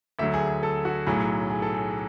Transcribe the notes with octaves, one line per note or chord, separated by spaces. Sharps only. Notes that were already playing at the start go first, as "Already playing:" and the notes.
D2 D3 F#3 E5
G#4
G#4
A4
F#4
B1 A2 F#3 G#4
G#4
A4
G#4